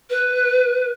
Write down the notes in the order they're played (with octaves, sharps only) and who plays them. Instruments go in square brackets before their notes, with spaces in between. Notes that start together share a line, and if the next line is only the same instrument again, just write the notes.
[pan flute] B4